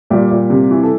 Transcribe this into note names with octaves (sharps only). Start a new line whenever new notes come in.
A#2 G3 G4
A#2
C3
E3
A4